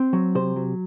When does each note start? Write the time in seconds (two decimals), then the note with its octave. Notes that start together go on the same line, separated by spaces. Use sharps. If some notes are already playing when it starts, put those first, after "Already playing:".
Already playing: C4
0.13 F#3
0.35 C3 C5
0.56 F#3